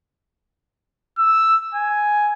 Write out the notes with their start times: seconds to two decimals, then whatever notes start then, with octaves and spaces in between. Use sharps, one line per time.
1.19 E6
1.74 G#5